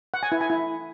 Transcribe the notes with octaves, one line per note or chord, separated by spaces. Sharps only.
F#5
G#5
E4
G#5
E4